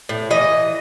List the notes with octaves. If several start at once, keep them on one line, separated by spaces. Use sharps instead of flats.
A2
E3 D#5